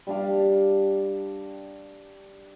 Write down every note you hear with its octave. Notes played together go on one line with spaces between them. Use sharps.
G3 D4 F5